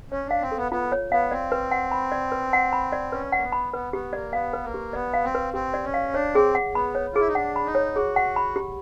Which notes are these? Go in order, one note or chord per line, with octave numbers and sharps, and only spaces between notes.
C#4 C#5
D4 F5
C4
A4
B3
B3 F4
C#5
B3 F5
C4 D5
B4
F#5
B5
D5
B4
F#5
B5
D5
C#4 B4
A#3 F#5
B3
B5
B3 B4
B3 G4
A#3 D5
B3 F5
B4
A#3
G4
B3 D5
F5
C4
B4
C4 G4
D5
C#4
F5
D4 C#5
C4 G#4
F#5
B3 B5
C#5
F4
E4 G#4
D#4
D4 F#5
B5
D#4
C#5
F#4 G#4
F#5
B5
G4